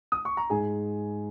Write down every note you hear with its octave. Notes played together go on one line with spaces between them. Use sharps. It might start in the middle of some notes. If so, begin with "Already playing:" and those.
D#6
C#6
A#5
G#2 G#4 G#5